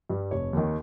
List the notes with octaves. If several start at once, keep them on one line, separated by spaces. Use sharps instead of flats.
G2 G3
F1 C#5
D#2 D#3